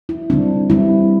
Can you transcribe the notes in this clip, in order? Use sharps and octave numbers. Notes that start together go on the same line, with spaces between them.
E4
D3 G3 C4 D4
D3 G3 C4 E4